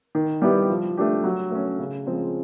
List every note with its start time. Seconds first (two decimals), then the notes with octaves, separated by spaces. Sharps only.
0.15 D#3
0.42 G3 B3 E4 G4
0.69 F3
0.97 A3 D4 G4
1.24 F#3
1.51 A3 C#4
1.79 C#3
2.06 F3 G#3 C4